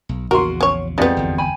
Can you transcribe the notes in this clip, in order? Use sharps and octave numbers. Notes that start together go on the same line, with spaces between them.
B1
A#1 E2 C#3 F#4 A#4 C6
C#4 C#5
F2 G#3 B3 G4 A4 D5
G1 E2
G5 G#5 B5